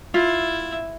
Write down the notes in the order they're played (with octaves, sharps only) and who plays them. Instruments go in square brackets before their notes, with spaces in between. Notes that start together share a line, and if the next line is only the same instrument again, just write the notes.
[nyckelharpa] E4 E5 [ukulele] F4